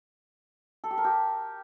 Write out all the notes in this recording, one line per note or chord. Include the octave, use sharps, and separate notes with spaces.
A4
G4
A#4
G4